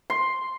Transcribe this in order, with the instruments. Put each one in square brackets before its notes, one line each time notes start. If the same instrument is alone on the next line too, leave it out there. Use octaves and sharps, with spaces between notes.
[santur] C6